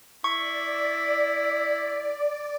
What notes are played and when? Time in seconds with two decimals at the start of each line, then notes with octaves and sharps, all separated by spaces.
0.24 E4 D5 C#6